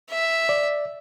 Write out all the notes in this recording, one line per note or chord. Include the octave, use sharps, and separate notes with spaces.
E5
D5